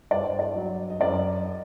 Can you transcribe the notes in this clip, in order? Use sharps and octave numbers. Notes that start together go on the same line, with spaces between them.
G2 D5
C5
D5
F#3
D#5
F#2 D5
D#5